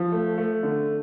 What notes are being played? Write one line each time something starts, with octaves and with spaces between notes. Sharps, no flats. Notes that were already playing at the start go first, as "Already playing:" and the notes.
Already playing: F3
A3
A3
D3